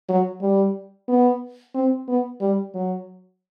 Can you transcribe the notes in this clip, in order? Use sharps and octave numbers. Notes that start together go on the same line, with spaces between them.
F#3
G3
B3
C4
B3
G3
F#3